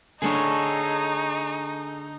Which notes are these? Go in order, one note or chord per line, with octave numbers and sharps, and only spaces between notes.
D3 A3 D4 D#4 G#4 A4 C#5